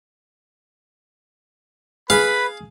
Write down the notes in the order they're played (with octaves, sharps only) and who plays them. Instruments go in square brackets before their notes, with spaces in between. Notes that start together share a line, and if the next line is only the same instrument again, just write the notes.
[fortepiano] G#4 [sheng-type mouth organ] B4 [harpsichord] F5 [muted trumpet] B5